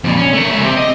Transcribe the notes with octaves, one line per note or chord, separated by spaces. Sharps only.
F2 A#2
C#4
A3 A#4
G#3 E5
C4 G4
D#5